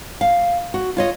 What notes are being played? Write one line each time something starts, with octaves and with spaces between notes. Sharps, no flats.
F5
F#4
F4 C#5 D#5